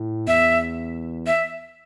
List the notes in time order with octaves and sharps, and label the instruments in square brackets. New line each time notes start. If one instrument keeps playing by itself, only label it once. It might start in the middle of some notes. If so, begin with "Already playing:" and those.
Already playing: [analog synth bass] A2
[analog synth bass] E2 [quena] E5
[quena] E5